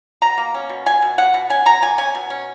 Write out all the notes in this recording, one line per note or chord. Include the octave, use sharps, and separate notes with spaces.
B2 A#5
A#3
C#4
B2
B2 G#5
B2
B2 F#5
B2
C#4 G#5
B2 A#5
A#3 G#5
C#4 G#5
B2
C#4